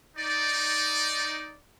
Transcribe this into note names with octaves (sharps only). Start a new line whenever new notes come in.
D#4 D5